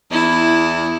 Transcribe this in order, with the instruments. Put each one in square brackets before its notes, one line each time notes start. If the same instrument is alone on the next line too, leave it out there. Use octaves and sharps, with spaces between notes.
[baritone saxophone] E2 [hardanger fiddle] E4